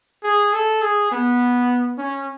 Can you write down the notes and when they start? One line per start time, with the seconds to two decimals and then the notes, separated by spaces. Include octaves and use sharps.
0.24 G#4
0.53 A4
0.82 G#4
1.12 B3
1.98 C#4